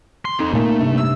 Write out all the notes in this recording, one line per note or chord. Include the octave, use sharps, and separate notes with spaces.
C6
C4 D#4 A4
A#2 A3 A#3 G#5
G2 C3
E6